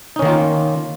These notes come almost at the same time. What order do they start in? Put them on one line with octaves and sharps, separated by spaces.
D#4 C#4 D#3 A#3 F4